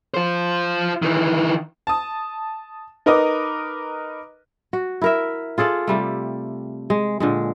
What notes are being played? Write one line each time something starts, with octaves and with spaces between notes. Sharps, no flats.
F4 C5
D#3 E3
A5 D#6
D#4 A#4 B4 D#5 D6 D#6
F#4
E4 A#4 E5
F4 G#4 A4 D5
C3 G3 A3
G#3
A#2 D3 G#3